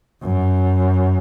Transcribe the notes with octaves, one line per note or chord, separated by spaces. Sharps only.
F#2